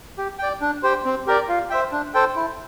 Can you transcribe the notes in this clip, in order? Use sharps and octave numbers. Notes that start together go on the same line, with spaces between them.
G4
D5 G5
D4
G4 C5 G5
C4
G4 A#4 D5
F4
C5 E5 G5
D4
A4 C5 G5
E4